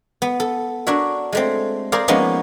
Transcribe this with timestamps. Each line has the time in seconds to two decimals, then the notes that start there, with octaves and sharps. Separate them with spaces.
0.22 B3
0.40 A4
0.87 D4 F#4 A#4 C#5 E5
1.33 G#3 A3 C4
1.92 G#4 A#4 C5 D5 F5
2.08 F3 G#3 A#3 B3 C#4 D#4